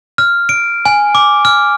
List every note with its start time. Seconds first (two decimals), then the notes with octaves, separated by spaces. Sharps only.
0.18 F6
0.49 D7
0.86 G#5
1.15 D6
1.45 F6